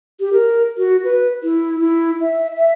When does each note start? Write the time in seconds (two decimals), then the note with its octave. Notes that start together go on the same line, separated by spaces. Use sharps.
0.20 G4
0.33 A#4
0.78 F#4
1.04 B4
1.43 E4
1.80 E4
2.21 E5
2.58 E5